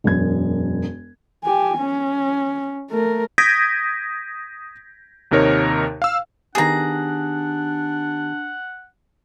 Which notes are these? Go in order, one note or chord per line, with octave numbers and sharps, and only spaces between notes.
E1 F#2 G#6
G4 G#5
C#4
A3 A#4
D#6 G6 G#6 A#6 B6 D7
D#2 C3 D#4 A#4 C#5
F5 E6
D#3 B3 D4 G4 G#4 F#5 A#5